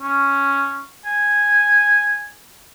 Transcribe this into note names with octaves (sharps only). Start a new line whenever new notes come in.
C#4
G#5